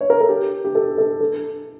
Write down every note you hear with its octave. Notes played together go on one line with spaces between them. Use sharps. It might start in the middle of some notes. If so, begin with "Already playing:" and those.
C#5
A#4
A4
G4
G4
A4
A4
A4